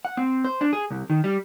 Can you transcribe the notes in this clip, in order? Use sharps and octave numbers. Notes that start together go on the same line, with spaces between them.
F#5
C4
C5
D4
G#4
C2
D#3
G3